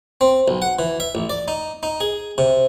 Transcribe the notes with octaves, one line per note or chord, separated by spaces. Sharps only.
C4
B1
F#5
E3
E5
A1
D5
D#4
D#4
G#4
C3